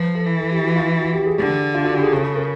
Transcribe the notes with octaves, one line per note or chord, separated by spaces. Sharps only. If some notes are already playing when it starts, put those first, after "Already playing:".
Already playing: F3 B4
A4
E3
A4
G4
F#4
F4
F4
F#4
G4
G#4
D3 G4
F4
F#4
G4
G#4
C#3 A4
A4
A#4